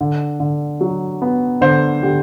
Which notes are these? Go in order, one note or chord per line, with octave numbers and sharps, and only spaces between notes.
D3
D3
F#3
B3
D3 C5
D3 G4